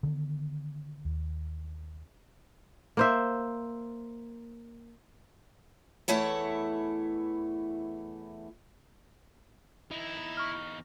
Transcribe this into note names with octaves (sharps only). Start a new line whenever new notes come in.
D3 D#3 B3
D#2
A#3 C5 E5
E2 E3 A3 E4 C#5
E3 D#4 E4
E2 D#4
C#6 F6